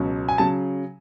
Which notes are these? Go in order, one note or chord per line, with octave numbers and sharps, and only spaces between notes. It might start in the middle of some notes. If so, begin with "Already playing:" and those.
Already playing: C#2 B2 F#3
G#5
C#3 F#3 A5